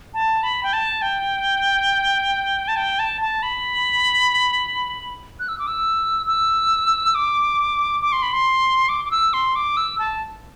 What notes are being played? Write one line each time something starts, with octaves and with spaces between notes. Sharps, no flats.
A5
B5
G5
A5
G5
A5
G5
A5
A5
B5
F#6
E6
D6
E6
E6
D6
D6
C6
B5
C6
D6
D6
E6
C6
D6
E6
A5